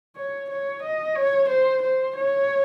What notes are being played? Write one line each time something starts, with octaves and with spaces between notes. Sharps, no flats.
C#5
C#5
D#5
C#5
C5
C5
C#5